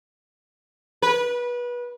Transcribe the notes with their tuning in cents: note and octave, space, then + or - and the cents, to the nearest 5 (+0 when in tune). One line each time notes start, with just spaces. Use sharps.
B4 -25